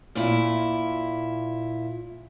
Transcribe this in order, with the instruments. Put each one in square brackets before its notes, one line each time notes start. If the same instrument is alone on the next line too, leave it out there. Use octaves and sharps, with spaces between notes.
[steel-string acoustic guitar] A#2 E4